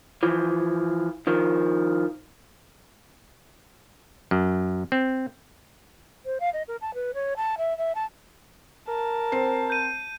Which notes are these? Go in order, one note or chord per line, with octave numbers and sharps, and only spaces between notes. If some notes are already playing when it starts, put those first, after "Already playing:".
E3 F3
D#3 F3
F#2
C4
C5
F5
D#5
A#4
A5
B4
C#5
A5
E5
E5
A5
A#4 A5
C4 C5 C7
G6 D#7